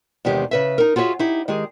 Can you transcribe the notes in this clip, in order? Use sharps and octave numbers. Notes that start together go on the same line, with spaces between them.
E2 C3 D#3 G#3 G4
C#3 B4 E5
D#4 A#4
F4 F#4 G#4 C#5 E5
D#4 E4 G4
D#3 G#3 G4 G#4